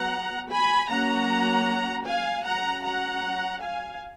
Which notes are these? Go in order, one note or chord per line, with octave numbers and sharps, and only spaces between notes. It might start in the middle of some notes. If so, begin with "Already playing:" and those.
Already playing: F#3 B3 F#5 A#5
G#5 B5
F#3 A#3 C#4 F#5 A#5
F5 G#5
F#3 C#4 F#5 A#5
F#5 A#5
F5 G#5